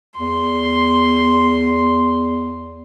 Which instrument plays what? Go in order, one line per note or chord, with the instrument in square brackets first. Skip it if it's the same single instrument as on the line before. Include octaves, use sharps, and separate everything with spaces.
[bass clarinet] E2 [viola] C6